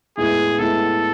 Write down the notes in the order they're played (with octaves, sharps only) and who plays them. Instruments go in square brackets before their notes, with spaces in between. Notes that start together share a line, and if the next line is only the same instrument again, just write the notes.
[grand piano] A2 G#3 B3 E4 [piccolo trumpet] G#4
[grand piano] A2 G#3 B3 E4 [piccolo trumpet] A4